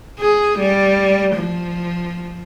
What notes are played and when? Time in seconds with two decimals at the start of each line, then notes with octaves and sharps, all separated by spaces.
0.20 G#4
0.59 G3
1.35 F3